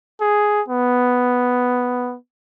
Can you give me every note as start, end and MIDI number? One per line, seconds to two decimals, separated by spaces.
0.21 0.62 68
0.68 2.16 59